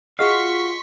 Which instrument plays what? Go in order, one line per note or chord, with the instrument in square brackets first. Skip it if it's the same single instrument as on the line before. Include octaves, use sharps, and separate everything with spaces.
[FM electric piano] F4 G#4 D#5 [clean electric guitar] F#4 F5 [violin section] C6 C#6 B6